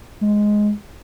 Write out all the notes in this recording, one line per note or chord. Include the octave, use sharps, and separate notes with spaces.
G#3